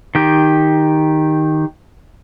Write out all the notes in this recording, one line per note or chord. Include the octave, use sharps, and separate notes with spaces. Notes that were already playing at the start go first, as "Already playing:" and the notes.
D#3 G4